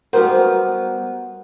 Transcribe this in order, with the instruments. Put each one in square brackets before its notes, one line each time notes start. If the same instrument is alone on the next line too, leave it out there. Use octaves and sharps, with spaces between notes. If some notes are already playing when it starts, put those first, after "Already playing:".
[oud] G3 B3 C5 [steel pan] F#4 G4 A#4 [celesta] F#5